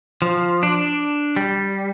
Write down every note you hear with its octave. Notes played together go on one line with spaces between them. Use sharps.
F3
D4
G3